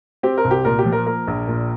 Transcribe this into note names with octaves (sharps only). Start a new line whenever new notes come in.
C4 G4
A#4
C2
G4
A#2 A#4
G4
F3
A#4
A#3 A#4
A#1
A#2